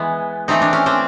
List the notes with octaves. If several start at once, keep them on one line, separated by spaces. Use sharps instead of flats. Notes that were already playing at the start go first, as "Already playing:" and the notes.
Already playing: E3 G#3 B3
E3 A3 C4 D#4
D4
C#4
C4 D4